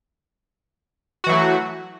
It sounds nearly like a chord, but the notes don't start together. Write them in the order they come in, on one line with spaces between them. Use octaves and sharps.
F#4 E3 F#3 A3